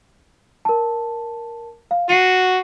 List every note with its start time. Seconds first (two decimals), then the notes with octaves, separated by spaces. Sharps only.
0.65 A#4 A5
1.91 F5
2.09 F#4 C7 C#7 D#7